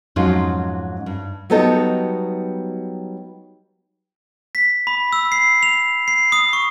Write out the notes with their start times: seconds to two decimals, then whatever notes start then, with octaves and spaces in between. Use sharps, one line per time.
0.16 F2 G#2 F#3 C#4 D#4 F4
1.06 G2
1.50 F#3 G3 B3 D#4 A4
4.55 B6
4.87 B5
5.12 E6
5.32 C7
5.63 F7
6.08 C7
6.32 D#6
6.53 C#6